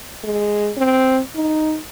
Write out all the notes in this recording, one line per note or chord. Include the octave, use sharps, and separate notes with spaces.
G#3
C4
D#4